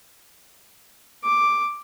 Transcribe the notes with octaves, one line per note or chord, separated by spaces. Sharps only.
D6